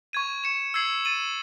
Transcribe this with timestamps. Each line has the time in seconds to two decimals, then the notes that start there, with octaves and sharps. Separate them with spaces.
0.13 C#6 G#6 D#7
0.44 C#6 G#6 C#7 E7
0.74 E6 G#6 C7 F#7
1.05 E6 A6 D#7 F#7